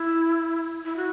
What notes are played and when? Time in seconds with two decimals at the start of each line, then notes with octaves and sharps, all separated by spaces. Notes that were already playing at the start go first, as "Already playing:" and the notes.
Already playing: E4
0.85 E4
0.96 F#4